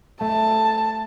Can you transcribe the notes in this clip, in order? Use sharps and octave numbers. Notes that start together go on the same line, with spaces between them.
A3 A5